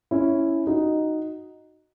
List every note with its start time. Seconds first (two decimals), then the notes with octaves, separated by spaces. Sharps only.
0.11 C#4 E4
0.67 D#4 F#4